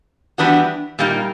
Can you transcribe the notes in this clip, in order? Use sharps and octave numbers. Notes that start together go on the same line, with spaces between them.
E3 G3 B3 D4 F#4
A#2 G3 A#3 D#4